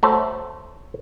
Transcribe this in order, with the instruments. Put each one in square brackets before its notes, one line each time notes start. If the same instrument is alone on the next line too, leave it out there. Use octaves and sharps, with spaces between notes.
[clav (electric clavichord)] A3 F#4 C5 C#5 E5 A5